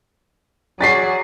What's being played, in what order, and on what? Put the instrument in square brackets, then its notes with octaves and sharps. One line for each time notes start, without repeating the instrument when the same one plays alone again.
[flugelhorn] F#3 [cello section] F#4 G#4 D5 [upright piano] A6 B6 C7